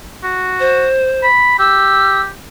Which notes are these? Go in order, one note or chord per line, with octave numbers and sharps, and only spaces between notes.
F#4
C5
B5
G4 E6